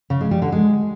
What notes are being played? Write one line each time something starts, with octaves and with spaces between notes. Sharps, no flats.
C#3
G#3
G3
D3
G#3